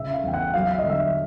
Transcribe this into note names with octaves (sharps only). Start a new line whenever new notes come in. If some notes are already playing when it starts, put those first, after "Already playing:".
Already playing: C#3 E5
F5
E2 G5
F#5
F#3 F5
E5
D#5
D3
E5